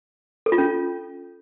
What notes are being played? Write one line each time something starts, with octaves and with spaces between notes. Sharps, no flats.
A4
F4
C#4